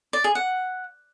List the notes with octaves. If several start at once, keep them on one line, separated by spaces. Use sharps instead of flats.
D5
G#4
F#5